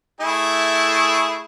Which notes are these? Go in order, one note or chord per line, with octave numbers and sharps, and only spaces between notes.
A3 E4 G#4